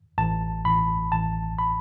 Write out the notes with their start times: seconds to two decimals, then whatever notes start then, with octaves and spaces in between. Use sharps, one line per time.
0.18 A1 A5
0.65 A1 B5
1.12 A1 A5
1.59 B5